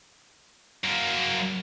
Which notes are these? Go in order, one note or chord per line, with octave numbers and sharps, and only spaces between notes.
F#2 A#3